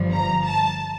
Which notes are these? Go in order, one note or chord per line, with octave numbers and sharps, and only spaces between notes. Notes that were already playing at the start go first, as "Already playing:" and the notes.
Already playing: G1 G2 F3
A#5
A5